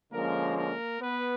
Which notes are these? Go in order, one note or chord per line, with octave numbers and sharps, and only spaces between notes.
D3 F3 G#3 A#3 C#4 A#4
A#3 A#4
B3 B4